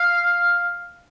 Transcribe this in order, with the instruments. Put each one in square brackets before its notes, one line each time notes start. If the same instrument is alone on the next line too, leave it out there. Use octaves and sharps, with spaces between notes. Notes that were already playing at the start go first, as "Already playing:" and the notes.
Already playing: [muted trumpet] F5